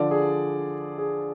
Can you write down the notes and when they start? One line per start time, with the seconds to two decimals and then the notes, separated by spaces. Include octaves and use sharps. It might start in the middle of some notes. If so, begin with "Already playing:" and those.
Already playing: D3 F3 D5
0.11 G#4
0.98 G#4